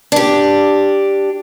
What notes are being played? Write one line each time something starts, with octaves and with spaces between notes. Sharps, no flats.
D4 G4